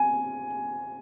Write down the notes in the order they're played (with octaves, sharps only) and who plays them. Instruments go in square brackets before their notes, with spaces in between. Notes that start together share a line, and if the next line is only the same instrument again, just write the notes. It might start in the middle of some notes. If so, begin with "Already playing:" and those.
Already playing: [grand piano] G#5